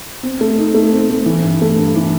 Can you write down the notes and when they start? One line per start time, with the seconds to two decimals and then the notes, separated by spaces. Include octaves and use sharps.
0.23 C4
0.41 A3
0.58 D#4
0.74 A3
0.93 C4
1.10 A3
1.26 E3
1.43 G2
1.62 A3
1.78 G2
1.96 E3